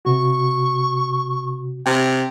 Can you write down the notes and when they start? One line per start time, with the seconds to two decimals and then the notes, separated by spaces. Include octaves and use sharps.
0.05 C3 F#4 C#6
1.86 C3 G5